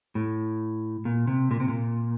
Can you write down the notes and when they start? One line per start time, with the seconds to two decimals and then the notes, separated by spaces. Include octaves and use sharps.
0.15 A2
1.05 A#2
1.27 C3
1.51 A#2
1.60 C3
1.68 A#2